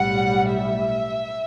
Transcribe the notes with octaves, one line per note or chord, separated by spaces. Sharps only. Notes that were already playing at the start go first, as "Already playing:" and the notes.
Already playing: B1 A2 G3 F#5
E5